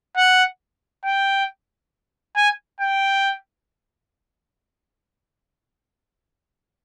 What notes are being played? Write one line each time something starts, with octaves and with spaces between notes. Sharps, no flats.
F#5
G5
G#5
G5